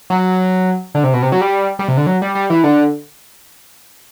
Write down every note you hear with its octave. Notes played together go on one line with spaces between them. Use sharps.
F#3
D3
C3
B2
C3
F#3
G3
G3
C3
D3
F#3
G3
G3
E3
D3